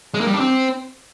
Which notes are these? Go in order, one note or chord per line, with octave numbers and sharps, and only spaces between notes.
G#3
A#3
G3
D4
C4